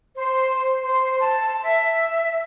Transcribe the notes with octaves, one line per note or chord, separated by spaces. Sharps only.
C5
C5
A5
E5